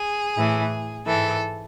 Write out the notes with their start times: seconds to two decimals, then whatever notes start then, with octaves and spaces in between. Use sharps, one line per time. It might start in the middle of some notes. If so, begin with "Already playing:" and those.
Already playing: G#4
0.36 A2 E3
1.06 G#2 E3 A4